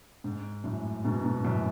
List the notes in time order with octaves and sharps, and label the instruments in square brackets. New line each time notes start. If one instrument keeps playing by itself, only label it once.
[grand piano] G#2
F#2 A2
G#2 B2
G#2 B2
F#2 A2